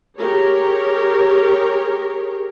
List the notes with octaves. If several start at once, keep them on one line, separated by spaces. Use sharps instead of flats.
G4 G#4 A#4 C#5